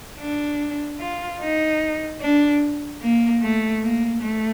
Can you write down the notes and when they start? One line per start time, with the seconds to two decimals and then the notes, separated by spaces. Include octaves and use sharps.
0.19 D4
1.00 F4
1.41 D#4
2.21 D4
3.02 A#3
3.42 A3
3.82 A#3
4.22 A3